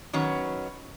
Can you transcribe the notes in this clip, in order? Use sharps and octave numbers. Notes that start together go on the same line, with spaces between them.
D#3 F#3 B3 C#4